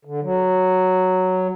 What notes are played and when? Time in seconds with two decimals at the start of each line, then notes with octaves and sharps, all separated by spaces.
0.05 D3
0.22 F#3